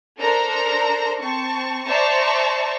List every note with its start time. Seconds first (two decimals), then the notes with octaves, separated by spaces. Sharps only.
0.18 D4 A4 A#4 C5 A#5
1.21 C4 A5 C#6
1.86 C5 D5 E5 A5 A#5 C#6